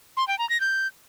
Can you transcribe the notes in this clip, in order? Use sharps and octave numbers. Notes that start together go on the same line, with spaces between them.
C6
G5
A#5
A#6
G6